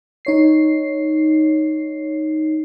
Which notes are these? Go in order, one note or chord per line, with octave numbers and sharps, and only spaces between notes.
D#4 C#5 C7